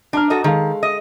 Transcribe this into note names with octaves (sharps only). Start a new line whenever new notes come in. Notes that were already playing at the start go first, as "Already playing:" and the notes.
D4 A5 A#5 F6
F#4 A4 D#5
D#3 G#3 A4 F5
D#5